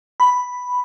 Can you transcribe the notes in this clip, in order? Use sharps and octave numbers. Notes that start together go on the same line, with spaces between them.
B5